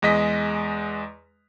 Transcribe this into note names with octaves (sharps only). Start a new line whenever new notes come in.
E2 G#3 D#5 B6